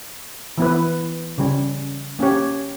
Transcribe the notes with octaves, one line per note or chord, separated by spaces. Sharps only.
E3 B3 E4 B4
C#3 G3 C#4
A#3 C#4 G4 C#5